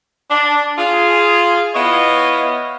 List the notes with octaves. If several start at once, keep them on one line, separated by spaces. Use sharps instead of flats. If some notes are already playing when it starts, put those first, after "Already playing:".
D4
F4 G#4
B3 E4 C#5 D#5 F5